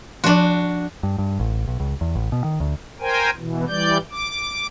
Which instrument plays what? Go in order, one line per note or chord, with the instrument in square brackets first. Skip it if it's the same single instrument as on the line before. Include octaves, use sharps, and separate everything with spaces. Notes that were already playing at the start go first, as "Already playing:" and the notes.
[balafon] F3 C6 [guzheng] D4 F#4
[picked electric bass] G2
G2
A1
B1
C#2
E2
A1
B2
D#3
D2
[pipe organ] A#4 C5 G5 G#5
B2 E3
E3 G3 D5 G6
D6